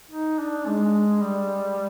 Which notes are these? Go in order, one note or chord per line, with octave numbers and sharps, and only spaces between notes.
D#4
D4
G#3
G3